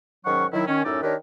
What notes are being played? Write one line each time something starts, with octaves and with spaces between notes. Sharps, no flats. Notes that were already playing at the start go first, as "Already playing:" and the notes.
G#2 D#3 F#3 C#4 F#5 C#6
D#3 F#3 E4
D#3 C#4
F#2 A2 C#4 D#4 D5 E6
D#3 D4 G4 A#4 B4 C#5